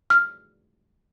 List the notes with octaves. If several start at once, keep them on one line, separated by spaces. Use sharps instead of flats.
F6